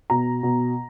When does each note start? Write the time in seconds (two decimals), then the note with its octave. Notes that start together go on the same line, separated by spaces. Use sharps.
0.10 B2 A#5
0.43 B2